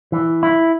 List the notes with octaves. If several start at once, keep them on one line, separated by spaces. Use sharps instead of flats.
E3
E4